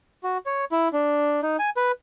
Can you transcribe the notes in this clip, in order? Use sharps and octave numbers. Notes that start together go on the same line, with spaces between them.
F#4
C#5
E4
D4
D#4
G#5
B4